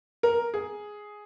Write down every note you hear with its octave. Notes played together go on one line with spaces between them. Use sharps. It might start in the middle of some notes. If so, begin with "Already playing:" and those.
A#4
G#4